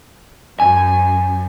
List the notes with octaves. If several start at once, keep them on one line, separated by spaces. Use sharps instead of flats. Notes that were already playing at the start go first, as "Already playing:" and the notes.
F#2 G#5